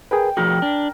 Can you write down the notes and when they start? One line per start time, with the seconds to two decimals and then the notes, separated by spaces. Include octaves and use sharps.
0.11 G#4 A#4 B4 G5
0.37 F3 F#4 G#4 A#4 G5
0.62 D4